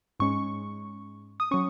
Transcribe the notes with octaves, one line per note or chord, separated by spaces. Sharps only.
G#2 G#3 C#4 C#6
D#6
F#3 C#4 C#6